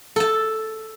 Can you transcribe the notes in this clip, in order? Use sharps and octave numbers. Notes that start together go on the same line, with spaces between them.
A4 A5